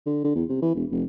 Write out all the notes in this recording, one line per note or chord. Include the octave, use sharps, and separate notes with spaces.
D3
D3
E2
C3
E3
E1
F1